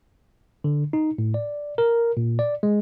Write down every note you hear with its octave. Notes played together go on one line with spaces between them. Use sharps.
D3
D#4
A2
D5
A#4
A#2
D5
G#3